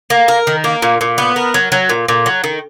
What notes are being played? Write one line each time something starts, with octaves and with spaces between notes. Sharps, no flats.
A#3
A#4
D#3
A#3
A#2
A#2
B3
A#4
F#3
F#3
A#2
A#2
F#3
D#3